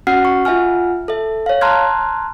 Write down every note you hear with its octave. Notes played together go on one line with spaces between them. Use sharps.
C#4 F#4 F#5 F6 C7
C#6
F4 E5 F#5 G#5 F6
A4 E5
C#5 F5
A5 A#5 C6 F6 F#6 G#6